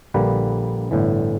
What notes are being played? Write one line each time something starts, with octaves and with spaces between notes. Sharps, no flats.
A#1 D3 G3 A#3 B4
G1 A2 D3 E3